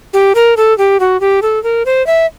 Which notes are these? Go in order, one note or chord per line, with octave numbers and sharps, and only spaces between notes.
G4
A#4
A4
G4
F#4
G4
A4
A#4
C5
E5